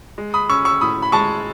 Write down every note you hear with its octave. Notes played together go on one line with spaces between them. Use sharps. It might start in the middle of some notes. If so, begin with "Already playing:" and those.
G#3
B5 D#6
C#4 C#6 E6
C#6 E6
A2 B5 D#6
B5
G#3 A5 C#6